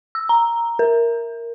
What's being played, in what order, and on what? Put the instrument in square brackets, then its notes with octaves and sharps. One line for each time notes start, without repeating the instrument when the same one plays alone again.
[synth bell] E6
A#5
A#4